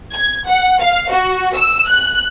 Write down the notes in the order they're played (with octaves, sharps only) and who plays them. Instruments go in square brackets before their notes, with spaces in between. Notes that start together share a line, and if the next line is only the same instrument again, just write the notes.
[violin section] G#6
F#5
F5
F#4
E6
F#6